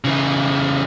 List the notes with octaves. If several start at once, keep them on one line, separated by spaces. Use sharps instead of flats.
C#3 E3